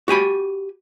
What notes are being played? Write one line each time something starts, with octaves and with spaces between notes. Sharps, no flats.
F#4 G4 G#5 B5